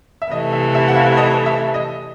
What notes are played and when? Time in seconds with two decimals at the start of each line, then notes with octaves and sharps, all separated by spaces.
0.22 E5
0.31 C3 E3 A3 D#5
0.53 E5
0.75 E5
0.88 F#5
0.96 F5
1.17 D#5
1.46 E5
1.74 D#5